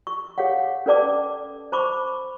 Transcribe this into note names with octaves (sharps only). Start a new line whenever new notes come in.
C#6
G#4 C#5 F5 F#5
C#4 A4 B4 D5 A5 D6
C5 A5 B5 C#6 D6